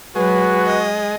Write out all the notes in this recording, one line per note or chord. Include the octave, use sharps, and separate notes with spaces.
F#3 G#3 F#4 B4
D#5